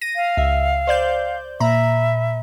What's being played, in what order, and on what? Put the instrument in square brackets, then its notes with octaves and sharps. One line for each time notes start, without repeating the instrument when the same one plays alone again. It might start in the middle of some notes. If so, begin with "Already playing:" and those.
[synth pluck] A#6 D#7
[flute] F5
[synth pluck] C#2 E5
C5 D5 G6
[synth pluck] A#2 A#5 B5 [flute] E5